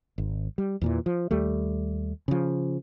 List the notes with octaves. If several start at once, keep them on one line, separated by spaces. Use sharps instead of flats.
G#1
G3
E2 A#2 E3
F3
D#2 G3 A3
C#3 F3